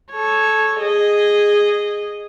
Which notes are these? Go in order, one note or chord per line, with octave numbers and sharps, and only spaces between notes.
A4 C#5
G#4 D#5